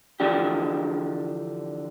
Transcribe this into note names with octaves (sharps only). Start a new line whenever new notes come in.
D3 E3 F3 D4 G4